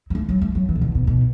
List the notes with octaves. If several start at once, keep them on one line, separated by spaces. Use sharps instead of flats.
F#3
A3
F#3
A3
F#3
E3
B2
D3
B2
B2